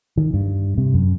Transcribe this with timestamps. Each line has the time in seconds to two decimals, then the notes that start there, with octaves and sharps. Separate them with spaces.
0.17 D#3
0.34 G2
0.78 C3
0.94 F#2